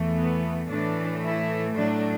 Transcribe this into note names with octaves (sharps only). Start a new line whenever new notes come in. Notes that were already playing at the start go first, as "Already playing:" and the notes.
Already playing: E2 E3 A3
B3
A2 E3 A3 D4
E4
A2 F#3 A3 D4